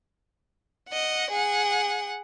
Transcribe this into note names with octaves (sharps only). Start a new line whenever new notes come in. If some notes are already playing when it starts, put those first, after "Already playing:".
D#5 F#5
G#4 F#5